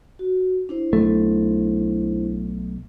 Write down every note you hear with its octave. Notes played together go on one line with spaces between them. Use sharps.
F#4
D4 E4 C5
B1 A3